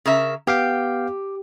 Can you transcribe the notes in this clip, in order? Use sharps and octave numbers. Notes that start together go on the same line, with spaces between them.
C#3 A#4 E5
B3 G4 F5 G5